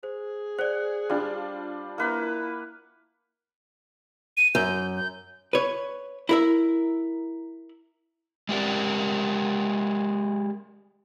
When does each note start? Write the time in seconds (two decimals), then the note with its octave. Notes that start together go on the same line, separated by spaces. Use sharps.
0.03 G#4 C5
0.58 C5 D5 F#5
1.10 G3 D4 F4
1.98 A#3 E4 B4 F#5
4.37 D#7
4.55 F#2 G6
4.96 G6
5.53 B4 C#5
6.29 E4 A#4 E5
8.49 G#3 G4 A#4 D5